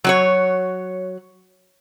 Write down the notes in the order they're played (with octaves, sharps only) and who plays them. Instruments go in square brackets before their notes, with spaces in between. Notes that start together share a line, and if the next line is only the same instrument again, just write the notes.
[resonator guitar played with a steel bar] F#3 F#4 C#5